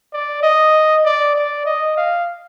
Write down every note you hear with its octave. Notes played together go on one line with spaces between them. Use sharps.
D5
D#5
D5
D5
D#5
F5